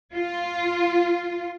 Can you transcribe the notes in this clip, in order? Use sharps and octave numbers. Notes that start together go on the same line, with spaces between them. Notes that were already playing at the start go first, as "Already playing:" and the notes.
F4